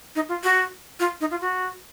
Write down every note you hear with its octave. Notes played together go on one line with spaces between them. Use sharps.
D#4
F4
F#4
F4
D#4
F4
F#4